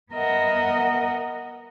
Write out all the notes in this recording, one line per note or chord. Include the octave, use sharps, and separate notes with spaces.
B3 A#4 D#5 E5 F#5